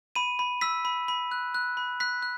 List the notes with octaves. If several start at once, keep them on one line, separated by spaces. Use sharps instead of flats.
B5 D#7
B5
E6 B6
B5
B5
F#6
F#6
B5
F#6 B6
F#6